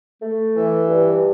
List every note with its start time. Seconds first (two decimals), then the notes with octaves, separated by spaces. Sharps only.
0.22 A3
0.55 E3
0.88 G2